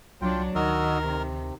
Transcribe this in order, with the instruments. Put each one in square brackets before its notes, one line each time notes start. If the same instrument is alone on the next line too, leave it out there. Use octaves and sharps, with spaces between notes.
[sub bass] C2 [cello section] F#3 D4 [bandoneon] F4 G5
[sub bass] D2 [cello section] D#3 [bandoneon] F#4 D#5 E6 [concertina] A#4
[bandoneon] C3